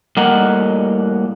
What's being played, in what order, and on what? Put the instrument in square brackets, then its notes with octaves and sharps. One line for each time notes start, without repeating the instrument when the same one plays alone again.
[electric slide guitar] A2 G3 A#3 A#4 D#5 F#5